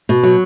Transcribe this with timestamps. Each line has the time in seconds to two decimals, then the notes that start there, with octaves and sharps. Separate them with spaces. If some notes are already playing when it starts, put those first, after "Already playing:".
0.09 B2
0.23 F#3